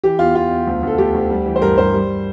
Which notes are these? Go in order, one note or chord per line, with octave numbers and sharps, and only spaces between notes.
E3 G4
E2 F4
E2 F4
E2
D2
D2 A4
D2 G4
D2
G3
E3
C5
G2 A#4
G2 C5
G3